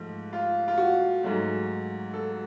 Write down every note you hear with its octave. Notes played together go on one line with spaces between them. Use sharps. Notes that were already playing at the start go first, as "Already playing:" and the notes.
Already playing: G#2 F3 A3
F4
F4
F#4
G#2 F#3 A3
A4